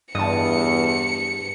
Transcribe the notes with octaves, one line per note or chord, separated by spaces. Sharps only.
E2 G2 D#5 A5 C#7